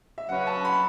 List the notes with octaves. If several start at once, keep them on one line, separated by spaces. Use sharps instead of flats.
E5
C#3 F#3 C#4 F#4 B4 F#5
A5
B5